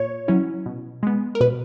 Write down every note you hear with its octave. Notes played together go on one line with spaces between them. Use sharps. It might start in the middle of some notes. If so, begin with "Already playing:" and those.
Already playing: A#2 C#5
F#3 C#4 E4
B2
G#3 B3
A#4
B2 B4